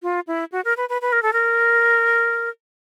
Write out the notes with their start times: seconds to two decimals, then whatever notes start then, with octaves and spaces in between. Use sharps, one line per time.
0.03 F4
0.27 E4
0.52 F#4
0.65 A#4
0.77 B4
0.89 B4
1.02 B4
1.12 A#4
1.23 A4
1.33 A#4